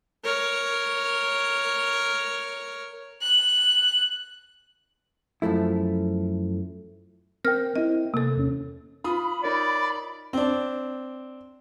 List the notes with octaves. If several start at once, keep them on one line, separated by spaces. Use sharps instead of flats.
A#4 C#5
F#6
F#2 F3 A3 E4
C4 A#4 G5 F6
C4 E4 D#5
C3 A#3 A4
E2 C#4
F4 B5 D#6
D#4 A#4 C#5 D5
C4 D4